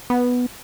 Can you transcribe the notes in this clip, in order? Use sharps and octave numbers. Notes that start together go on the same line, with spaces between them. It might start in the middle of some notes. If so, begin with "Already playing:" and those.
B3